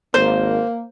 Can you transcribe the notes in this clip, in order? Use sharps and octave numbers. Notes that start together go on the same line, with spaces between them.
G#1 A#3 C5